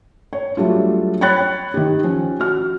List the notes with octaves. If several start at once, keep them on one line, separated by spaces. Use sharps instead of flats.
C#5
F#3 G3 A3 D4 F4
C#5 G5 B5 F#6 A6
D#3 G4
F3 C#4
F#4 F6